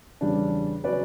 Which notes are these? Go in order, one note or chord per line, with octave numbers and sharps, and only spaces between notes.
E2 C#3 G3 D4
C#3 F#3 C#4 B4 D5